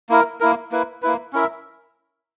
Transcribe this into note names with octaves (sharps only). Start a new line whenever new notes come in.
A#3 E4 A#4
A#3 E4 A#4
A#3 E4 B4
A#3 E4 B4
C#4 E4 A#4 E5